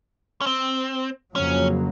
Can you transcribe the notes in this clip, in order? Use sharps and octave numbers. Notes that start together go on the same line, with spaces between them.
C#4
C4
F2 C#3 F#3 A#3 C#4